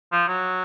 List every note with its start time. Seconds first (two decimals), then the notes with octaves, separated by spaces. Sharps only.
0.12 F3
0.28 F#3